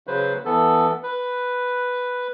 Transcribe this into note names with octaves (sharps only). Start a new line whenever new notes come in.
C#3 F#3 B4 C5
E3 B3 A4
B4